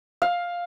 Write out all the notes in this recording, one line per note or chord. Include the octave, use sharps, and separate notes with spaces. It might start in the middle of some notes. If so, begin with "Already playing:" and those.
F5